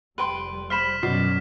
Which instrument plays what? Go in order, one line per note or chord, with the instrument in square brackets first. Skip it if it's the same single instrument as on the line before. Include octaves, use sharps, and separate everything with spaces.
[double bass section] F1 G3 [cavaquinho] B4 G5 C6
[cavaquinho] C5 B5 [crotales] F6 B6 E7
[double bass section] F#2 F#3 [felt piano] B2 [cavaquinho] D5 [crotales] C7